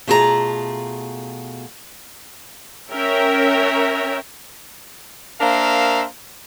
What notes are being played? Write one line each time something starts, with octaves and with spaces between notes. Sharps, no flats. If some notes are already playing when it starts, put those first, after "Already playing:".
B2 A3 F4 G#4 A4 A#5
C#4 A#4 C#5 E5 G5 A#5
A#3 D4 A#4 C5 E5 F5